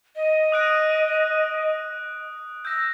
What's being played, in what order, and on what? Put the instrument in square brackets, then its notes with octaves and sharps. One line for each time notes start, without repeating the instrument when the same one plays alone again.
[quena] D#5
[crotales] D#6 F#6 D7
[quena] E6 [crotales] G6 A#6